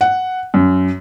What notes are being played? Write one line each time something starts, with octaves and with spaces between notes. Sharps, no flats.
F#5
F#2